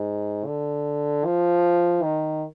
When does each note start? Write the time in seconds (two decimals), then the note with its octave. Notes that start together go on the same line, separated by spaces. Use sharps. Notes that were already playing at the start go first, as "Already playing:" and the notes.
Already playing: G#2
0.46 D3
1.25 F3
2.03 D#3